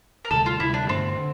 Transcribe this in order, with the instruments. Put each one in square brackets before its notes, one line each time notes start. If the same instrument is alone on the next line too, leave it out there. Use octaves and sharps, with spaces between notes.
[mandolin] A#4
[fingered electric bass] D2 C3 G3 [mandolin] A4
[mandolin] F4
[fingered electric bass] D2 C3 G3 [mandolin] E4
[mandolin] D4
[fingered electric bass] G2 D3 A3 D4 [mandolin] C4
[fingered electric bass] D3